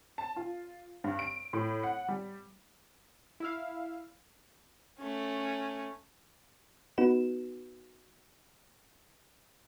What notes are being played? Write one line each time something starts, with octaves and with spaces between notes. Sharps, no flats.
A5
F4
G2
D7
A2
F#5
G3
E4 E5 F5
A3 C#4
B3 D#4 F#4 B4 E7